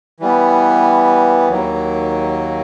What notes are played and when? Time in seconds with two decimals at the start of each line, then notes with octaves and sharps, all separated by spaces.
0.20 E3 G3 B3
1.48 D#2 D#3 F#3 A#3